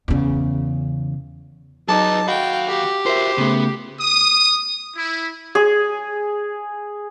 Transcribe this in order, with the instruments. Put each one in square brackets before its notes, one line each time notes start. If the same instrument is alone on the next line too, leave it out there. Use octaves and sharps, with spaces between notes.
[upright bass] E2 C#3
[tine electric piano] F#3 D6 [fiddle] D#4 [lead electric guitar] G#4 B4 [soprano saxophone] A5
[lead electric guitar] D#2 F5 [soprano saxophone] F#4 [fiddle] G5 [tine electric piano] B5
[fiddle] G4
[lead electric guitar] F4 F#4 [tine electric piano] A#4 E5 [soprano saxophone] C5
[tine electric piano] C#3 A3 [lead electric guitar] B3
[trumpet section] D#6
E4
[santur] G#4